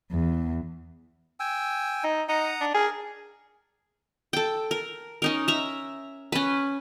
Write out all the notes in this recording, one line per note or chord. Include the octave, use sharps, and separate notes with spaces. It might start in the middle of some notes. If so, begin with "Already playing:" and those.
E2
G5 G#5 E6
D#4
D#4 F#5 A#5 D#6
D4
G#4 A#4
A4 G5
A#4
C#4 D#4 A#4
E5 A#5
C#4 B4